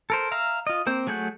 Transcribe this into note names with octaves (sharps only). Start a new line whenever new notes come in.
A4 A#4 C5
E5 F5 A#5
F4 D#5
A#3 C4 C5
F#3 A3 G#4 F#5 G6